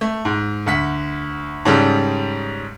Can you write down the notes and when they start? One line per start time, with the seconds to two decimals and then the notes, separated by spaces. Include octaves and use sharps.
0.01 A3
0.25 G#2
0.66 D2 F#5 B6
1.65 G#2 C#3 G3 A4